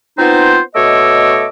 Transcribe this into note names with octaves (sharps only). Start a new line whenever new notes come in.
B3 C4 D#4 F4 C5
B2 A3 C#5 D#5 D6 E6